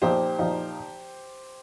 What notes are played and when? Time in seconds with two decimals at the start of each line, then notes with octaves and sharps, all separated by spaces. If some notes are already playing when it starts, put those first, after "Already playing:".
0.02 A#2 F3 D#4 G4 C5
0.39 A#2 F3 D#4